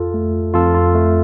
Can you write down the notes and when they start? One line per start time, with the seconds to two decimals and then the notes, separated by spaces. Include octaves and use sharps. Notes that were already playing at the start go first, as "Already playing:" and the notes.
Already playing: F2 F4 A4
0.14 A3
0.54 F2 F4 A4
0.74 F4
0.95 A3